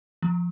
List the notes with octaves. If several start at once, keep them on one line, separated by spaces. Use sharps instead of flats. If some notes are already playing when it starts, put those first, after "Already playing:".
F3